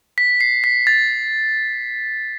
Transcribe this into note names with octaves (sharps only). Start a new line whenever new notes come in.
B6
C7
B6
A6